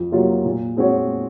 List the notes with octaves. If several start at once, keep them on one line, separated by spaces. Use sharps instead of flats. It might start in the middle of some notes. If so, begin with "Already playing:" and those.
Already playing: F2
C3 F#3 A#3 F4
A#2
G#3 C4 F#4 C#5